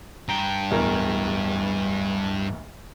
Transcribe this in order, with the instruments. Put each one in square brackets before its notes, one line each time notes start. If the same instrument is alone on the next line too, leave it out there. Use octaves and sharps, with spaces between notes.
[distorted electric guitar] G2 G5 [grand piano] A#5
[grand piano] D1 E2 A#4